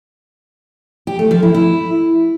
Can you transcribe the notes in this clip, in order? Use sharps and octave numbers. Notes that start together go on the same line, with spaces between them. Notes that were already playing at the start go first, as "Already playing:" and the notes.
G4
A3
F3
E4
E4